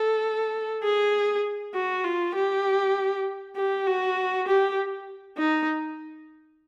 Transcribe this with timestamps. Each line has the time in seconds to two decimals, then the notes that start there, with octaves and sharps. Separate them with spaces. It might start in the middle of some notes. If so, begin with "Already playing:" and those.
Already playing: A4
0.84 G#4
1.74 F#4
2.04 F4
2.35 G4
3.56 G4
3.87 F#4
4.48 G4
5.38 D#4